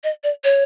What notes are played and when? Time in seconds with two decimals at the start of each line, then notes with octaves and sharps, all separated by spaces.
0.04 D#5
0.24 D5
0.44 C#5